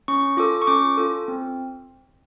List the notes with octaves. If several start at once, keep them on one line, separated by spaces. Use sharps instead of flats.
C#4 C#6
F4 A4 D6
C#6
C#4 D6
F4 A4
C4